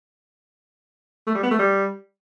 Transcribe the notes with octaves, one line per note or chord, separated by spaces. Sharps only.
A3
G3
B3
A3
G3